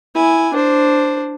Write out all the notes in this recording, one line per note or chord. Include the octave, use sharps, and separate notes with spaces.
E4 G#5
D4 C5